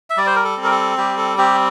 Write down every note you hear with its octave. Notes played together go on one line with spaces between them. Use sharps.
E5
G3 D5
C5
A#4
A4
C4
A#4
A4
G3 G4
A4
C4 G4